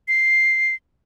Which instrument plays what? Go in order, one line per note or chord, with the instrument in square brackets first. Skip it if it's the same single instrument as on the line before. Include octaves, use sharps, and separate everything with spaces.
[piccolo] C7